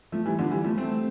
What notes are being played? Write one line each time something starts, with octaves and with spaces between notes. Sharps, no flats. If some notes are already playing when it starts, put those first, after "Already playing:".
F3 A3
E3 G3
D3 F3
E3 G3
F3 A3
A3 C4